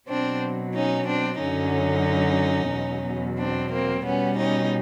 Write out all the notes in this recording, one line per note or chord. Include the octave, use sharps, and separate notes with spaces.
B2 F#3 C4 D4
C#4 D#4
C4 D4
F#2 D3 F#3 C#4 D#4
E2 B2 F#3
C4 D4
A#3 C4
B2 G3 B3 C#4
C#4 D#4